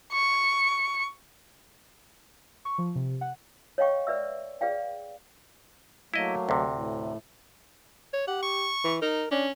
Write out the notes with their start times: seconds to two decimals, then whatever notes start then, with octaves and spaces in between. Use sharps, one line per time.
0.13 C#6
2.65 C#6
2.78 F3
2.96 C3
3.21 F#5
3.78 C#5 D#5 F5 G5 C#6
4.07 B4 D5 E5 E6
4.61 G#4 B4 D5 F5 G5
6.14 F#3 A3 A#3 E4 D#5
6.49 D2 C3
6.73 A2
8.13 C#5
8.28 G4 F#5
8.43 C#6
8.84 E3
9.02 D#4 A#4
9.31 C#4 D4